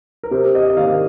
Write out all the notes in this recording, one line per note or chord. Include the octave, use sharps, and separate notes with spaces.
A#4
C3 C5
D#5
D#5
D#3 A#3 F5